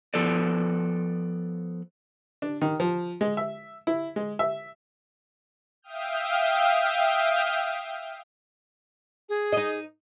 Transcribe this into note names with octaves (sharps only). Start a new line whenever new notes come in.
F3 B3 A4 B4 D5
D4
D#3
F3
G#3
E5
E4
G#3
E5
E5 F5 G5 D#6 F6 G6
G#4
D#4 D#5